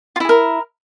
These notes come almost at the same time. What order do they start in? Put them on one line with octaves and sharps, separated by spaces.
F4 E4 G#4 A#4